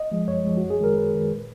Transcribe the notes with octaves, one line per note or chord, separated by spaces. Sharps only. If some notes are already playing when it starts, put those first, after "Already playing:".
Already playing: D#5
F3 G#3
F#2 C#5
F3 G#3
F#4
F#2
G#4
D#3 G#3 A#4
F#2 B4
D#3 G#3
A#2